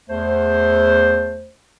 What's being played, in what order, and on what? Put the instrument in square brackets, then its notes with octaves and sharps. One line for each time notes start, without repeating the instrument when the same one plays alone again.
[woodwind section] E2 A3 C5